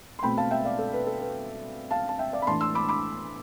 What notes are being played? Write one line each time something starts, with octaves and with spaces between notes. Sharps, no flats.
C6
B2 A3 C4 G5 B5
F5 A5
E5 G5
D5 F5
A4
B4
A4
B4
F5 A5
A5
E5 G5
D5 F5
B5
A2 E3 A3 D4 A5 C6
C6 E6
B5 D6
B5 D6